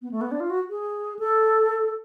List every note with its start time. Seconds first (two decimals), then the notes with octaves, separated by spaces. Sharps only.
0.02 B3
0.11 A3
0.21 B3
0.32 D4
0.40 F4
0.50 F#4
0.70 G#4
1.19 A4